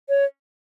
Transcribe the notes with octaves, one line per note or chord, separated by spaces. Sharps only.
C#5